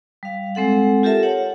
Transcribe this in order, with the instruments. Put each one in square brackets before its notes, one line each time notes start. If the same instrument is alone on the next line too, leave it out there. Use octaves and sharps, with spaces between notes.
[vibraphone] G3 F5
G#3 C4 A4 F#5
F4 G4 A4 A#4 E5 A5
C#5 F#5